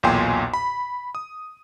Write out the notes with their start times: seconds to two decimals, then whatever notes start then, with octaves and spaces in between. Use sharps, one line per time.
0.03 B1 E2 A#2 G5 G#5 C6
0.54 B5
1.15 D#6